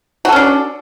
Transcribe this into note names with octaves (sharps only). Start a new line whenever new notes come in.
C#4 D4 F#4 A4